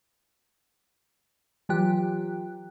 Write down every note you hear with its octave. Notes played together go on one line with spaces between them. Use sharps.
E3 F#3 F4 G4 G5 F#6